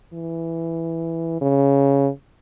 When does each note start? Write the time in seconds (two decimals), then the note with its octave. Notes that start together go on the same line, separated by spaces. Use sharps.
0.13 E3
1.41 C#3